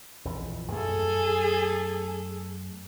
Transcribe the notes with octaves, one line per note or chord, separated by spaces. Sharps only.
A#1 F2 E3
F#2 A3 G#4 A4